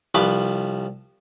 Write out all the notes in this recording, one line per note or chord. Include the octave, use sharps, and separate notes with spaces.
C2 F3 B4 D6